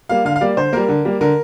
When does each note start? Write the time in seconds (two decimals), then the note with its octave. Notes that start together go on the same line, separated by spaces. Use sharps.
0.09 G3 A#3 F5
0.25 D3 F5
0.36 F5
0.41 G3 A#3 D5
0.57 D3 C5
0.73 G3 A#3 A#4
0.89 D3
1.05 G3 A#3
1.21 D3 A#4